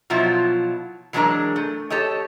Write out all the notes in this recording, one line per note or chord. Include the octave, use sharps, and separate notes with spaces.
B2 F3 F#3 E4 F4
E3 F#3 G#3 D4 A#4 D5
A3
G4 A4 C#5 D#5